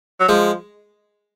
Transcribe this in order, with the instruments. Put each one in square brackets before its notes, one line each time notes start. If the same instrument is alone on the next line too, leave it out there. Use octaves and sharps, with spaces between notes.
[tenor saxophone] F#3
[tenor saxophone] F3 [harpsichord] G#3